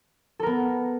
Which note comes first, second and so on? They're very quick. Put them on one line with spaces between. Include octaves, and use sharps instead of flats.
A4 A#4 B3